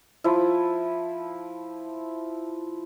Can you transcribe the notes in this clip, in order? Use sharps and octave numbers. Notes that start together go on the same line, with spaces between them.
F3 E4